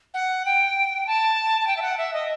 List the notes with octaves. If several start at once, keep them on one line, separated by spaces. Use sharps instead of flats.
F#5
G5
A5
A5
G5
E5
F#5
E5
D#5